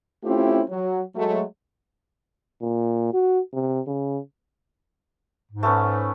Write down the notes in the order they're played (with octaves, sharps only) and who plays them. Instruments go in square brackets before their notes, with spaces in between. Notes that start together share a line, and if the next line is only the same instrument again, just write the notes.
[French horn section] A3 C4 C#4 E4 F4 G4
F#3
F#3 G#3 A3
[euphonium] A#2
F#4
C3
C#3
[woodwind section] G#2
[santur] A3 B3 C#4